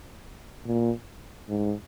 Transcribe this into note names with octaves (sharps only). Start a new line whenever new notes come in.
A#2
G#2